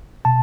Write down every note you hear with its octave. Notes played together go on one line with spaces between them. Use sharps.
B2 A5